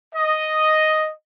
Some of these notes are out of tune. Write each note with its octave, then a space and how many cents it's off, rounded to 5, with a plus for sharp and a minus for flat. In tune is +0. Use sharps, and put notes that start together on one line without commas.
D#5 +0